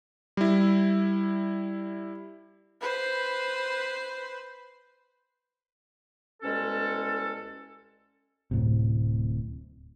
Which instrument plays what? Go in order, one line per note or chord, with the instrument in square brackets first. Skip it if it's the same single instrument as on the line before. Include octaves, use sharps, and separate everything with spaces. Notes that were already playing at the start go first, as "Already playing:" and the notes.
[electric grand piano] G3 E4
[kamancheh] B4 C5
[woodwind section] C2 B2 G#3 C#4 A4
[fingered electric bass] D1 A2 C3